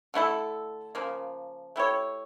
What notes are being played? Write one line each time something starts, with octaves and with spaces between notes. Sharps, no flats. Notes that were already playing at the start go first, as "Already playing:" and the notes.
D3 A3 E4 A4
C#3 F3 A#3
A3 E4 G4 C#5